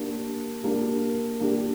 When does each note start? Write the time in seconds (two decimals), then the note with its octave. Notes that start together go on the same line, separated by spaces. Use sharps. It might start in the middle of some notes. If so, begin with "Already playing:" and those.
Already playing: A#3 D4 G4
0.63 A#3 D4 G4
1.40 A#3 D4 G4